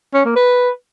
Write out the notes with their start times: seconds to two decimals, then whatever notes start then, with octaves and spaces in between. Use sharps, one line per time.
0.14 C#4
0.25 A#3
0.36 B4